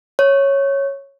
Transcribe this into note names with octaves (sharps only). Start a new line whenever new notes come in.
C#5